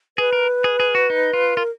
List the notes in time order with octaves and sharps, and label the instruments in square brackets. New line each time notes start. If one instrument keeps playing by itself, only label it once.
[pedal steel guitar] G#4 [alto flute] B4
[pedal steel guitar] A#4
G#4
G#4
F#4
D#4
F4
[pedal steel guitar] F4 [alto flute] A#4